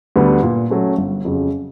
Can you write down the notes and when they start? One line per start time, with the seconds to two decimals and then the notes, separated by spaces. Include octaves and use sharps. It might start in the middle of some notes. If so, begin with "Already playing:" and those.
0.16 D2 D3 G3 B3
0.43 A#2
0.70 F#3 A3 C#4
0.98 G1
1.25 F2 C#3 F#3